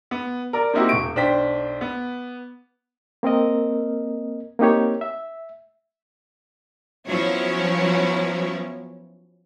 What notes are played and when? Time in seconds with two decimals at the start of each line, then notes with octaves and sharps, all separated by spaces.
0.11 B3
0.53 A#4 D5
0.73 A#3 C4 D#4 E4 F#4 G4
0.89 E1 C#6 D7
1.16 B1 D4 C5 G5 B6
1.81 B3
3.23 A#3 C4 A#4 D#5
4.59 A#3 C4 D#4 G4 C#5
5.01 E5
7.08 F3 F#3 B3 C#4 E4 C#5